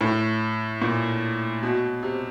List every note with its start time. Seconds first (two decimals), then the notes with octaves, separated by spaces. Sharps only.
0.01 A2
0.82 A#2
1.63 B2
2.03 C3